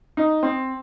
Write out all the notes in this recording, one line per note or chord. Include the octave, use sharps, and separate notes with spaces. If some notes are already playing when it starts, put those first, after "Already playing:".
D#4
C4